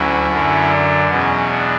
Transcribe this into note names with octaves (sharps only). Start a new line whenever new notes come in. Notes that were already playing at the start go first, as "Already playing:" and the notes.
Already playing: D2 F#3 C#4 E4
F#2 D3 F#3
D4
E2 B2 F#3 C#4
D4